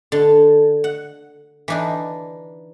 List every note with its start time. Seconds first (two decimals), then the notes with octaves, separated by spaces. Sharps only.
0.12 D3
0.84 F#5
1.68 E3 D4 D#4